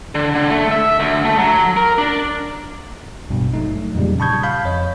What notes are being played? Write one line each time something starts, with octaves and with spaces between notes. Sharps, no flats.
D3
D3
A3
E5
D2
A3
F#3
A#4
D4
A1 G2 B2
F#3 A3 D#4
F2 A#2 C#3 G3
A5 B5 C#6 D#6 G6 G#6
F5 B5 G6
F2 C#5 D#5